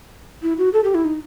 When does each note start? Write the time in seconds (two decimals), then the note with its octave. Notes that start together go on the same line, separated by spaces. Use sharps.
0.42 E4
0.58 F#4
0.73 A4
0.84 G4
0.94 E4
1.05 D#4